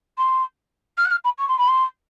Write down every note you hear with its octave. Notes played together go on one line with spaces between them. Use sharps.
C6
F6
F#6
F6
B5
C#6
C6
B5
C6